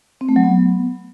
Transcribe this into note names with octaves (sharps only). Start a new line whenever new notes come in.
C4
A3
F#3
B3